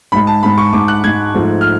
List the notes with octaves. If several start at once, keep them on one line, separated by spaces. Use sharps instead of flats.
G#2 G#3 B5
A5
G#2 G#3 B5
C#6
G#2 G#3 D6
F#6
G#2 G#3 G#6
G#2 F3 A3
F6